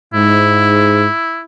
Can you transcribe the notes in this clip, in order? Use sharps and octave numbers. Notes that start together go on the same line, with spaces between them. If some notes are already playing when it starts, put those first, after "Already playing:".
G#2 E4